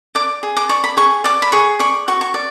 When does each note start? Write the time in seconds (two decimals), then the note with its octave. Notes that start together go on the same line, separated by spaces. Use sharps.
0.15 D5 D6
0.43 G#4
0.57 D6
0.69 D5 C#6
0.84 B5
0.97 G#4 C#6
1.24 D5 D6
1.42 B5
1.52 G#4 C#6
1.79 D5 C#6
2.08 F#4 C#6
2.21 C#6
2.34 D5